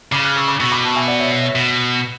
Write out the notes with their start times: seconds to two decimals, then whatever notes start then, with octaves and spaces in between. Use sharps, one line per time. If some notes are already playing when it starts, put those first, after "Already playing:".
0.12 C#3 B5 D6
0.24 D6 F#6
0.36 C#6 E6
0.48 B5 D6
0.60 B2 C#6 E6
0.71 B5 D6
0.84 A5 C#6
0.95 E5 G#5
1.07 D5 F#5
1.19 C#5 E5
1.31 C#5 E5
1.43 C#5 E5
1.55 B2